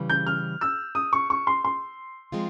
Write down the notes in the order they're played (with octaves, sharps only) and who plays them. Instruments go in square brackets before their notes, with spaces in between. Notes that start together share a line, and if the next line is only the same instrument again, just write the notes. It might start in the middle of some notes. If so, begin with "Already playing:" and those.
Already playing: [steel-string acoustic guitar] C#3 E3 G3
[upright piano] G6
F6
E6
D#6
C#6
C#6
C6
C6
[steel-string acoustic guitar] F3 G#3 C4 F4